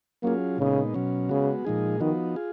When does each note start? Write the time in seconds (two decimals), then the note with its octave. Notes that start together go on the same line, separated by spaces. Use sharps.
0.23 F#3 A#3 C#4 F4 G#4
0.58 A#2 C#3 G#3 B3 D#4
0.94 B2 F#3 C#4
1.29 C#3 G#3 B3 F#4
1.64 A#2 F3 G#3 D#4 G#4
2.00 D#3 F3 B3 D#4 F#4
2.36 F4 G#4